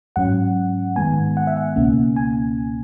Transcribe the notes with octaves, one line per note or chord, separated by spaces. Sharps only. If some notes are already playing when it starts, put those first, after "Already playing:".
G#2 F#3 C#4 F#5
G#2 D#3 G#3 B3 G#5
F#5
E5
F#5
C#2 B2 A#3 C#4
G#5